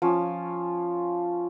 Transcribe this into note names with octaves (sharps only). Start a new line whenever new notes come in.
F3 C#4